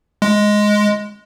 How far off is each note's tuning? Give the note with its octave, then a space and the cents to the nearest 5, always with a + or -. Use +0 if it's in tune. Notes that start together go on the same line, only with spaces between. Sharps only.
G#3 +5